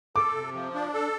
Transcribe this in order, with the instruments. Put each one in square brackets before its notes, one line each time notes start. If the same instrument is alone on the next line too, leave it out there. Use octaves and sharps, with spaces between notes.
[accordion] A4 [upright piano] D6
[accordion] C3
F3
D4
A4